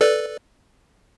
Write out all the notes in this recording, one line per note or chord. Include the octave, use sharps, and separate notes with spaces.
A4 B4 D5